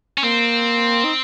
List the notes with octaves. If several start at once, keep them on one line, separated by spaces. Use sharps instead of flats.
C#4
A#3 C4
D#4